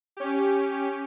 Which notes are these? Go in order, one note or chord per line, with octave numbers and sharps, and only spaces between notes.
C#4 G4